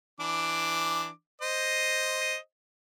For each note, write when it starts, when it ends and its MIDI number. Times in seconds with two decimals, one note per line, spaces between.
0.20 1.09 52
0.20 1.09 62
0.20 1.09 86
1.42 2.37 72
1.42 2.37 75